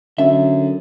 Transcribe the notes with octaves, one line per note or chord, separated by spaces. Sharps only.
F#2 D3 E5